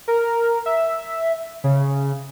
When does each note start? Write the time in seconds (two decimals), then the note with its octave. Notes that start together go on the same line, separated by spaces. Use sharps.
0.08 A#4
0.66 E5
1.64 C#3